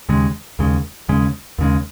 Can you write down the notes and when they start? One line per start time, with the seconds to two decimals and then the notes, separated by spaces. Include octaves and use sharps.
0.09 D#2 C#3 G#3
0.59 D#2 C#3 G#3
1.09 D#2 C#3 G#3
1.58 D#2 C#3 G#3